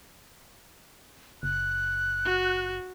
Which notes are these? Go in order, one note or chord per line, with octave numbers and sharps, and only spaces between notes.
F#1 F#6
F#4